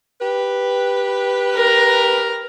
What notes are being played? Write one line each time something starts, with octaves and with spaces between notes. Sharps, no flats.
G4 B4
A#4 A#5